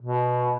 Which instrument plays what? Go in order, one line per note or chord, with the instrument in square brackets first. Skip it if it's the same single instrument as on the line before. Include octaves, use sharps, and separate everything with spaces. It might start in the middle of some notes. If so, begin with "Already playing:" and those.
[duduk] B2